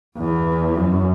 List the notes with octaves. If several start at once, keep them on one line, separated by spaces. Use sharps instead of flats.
E2
F#2